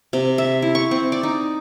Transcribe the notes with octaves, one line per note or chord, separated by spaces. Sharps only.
C3
E5
E4
C#6
C4
D5
D#4